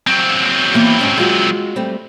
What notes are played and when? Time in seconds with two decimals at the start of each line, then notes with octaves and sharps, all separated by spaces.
0.07 F#3 C4
0.74 E3 A#3 B3
0.99 G#2 C#4 A5
1.18 G#3 F4 F#4
1.76 G3 A3 C4